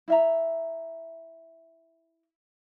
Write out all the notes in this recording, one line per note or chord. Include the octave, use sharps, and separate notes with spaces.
E4 E5 A#5